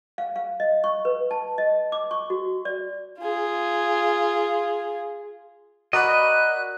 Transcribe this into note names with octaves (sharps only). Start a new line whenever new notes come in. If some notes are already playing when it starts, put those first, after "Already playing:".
F5
F5
D#5
C#6
B4
A5
D#5
D6
C#6
F#4
D5
F4 G#4
F#4 A#4 D5 D#5 B5 F#6